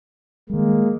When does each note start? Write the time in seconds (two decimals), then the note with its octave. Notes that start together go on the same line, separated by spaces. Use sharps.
0.50 D#3 G3 G#3 A#3